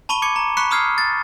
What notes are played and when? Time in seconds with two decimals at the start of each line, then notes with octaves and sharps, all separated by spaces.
0.09 A5 B5 C#6 D#7 G7
0.22 D6 G#6 C#7
0.36 A#5
0.57 B5 C#6 F#6 B6 C#7 E7
0.71 B5 D#6 F6 G#6 C7
0.98 A6